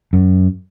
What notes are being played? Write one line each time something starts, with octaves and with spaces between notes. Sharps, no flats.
F#2